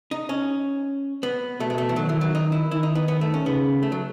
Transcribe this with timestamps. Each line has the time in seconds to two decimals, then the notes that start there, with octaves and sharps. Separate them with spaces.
0.11 D#4
0.29 C#4
1.23 B3
1.60 B2 A3
1.70 G#3
1.78 A3
1.89 E3
1.96 D#3 F#3
2.09 E3
2.21 F#3
2.35 D#4
2.52 E4
2.71 D#3 E4
2.83 D#4
2.95 B3
3.08 B3
3.21 A3
3.34 C#4
3.46 C#3 B3
3.83 A3
3.92 F#3